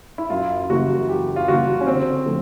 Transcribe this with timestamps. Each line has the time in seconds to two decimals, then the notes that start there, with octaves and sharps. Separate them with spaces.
0.18 E4
0.30 F#2 F4
0.69 C#3 E3 G3 A#3 F#4
1.08 F#2 G4
1.36 F4
1.48 C#3 E3 G3 A#3 F#4
1.81 C#4
1.87 D3 C4
2.26 F3 A3